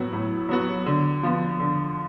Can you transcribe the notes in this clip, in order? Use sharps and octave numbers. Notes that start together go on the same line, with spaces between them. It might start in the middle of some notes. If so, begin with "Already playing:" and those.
Already playing: A2 F#3 B3 F#4
A2
F#3 B3 F#4
D3
F3 B3
D3